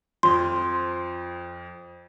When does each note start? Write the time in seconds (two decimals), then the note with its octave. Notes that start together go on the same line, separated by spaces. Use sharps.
0.23 F2 F3 C6